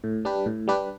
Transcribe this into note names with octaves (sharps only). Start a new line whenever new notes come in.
A2
G3 D4 G4 B4
A2
G3 D4 G4 B4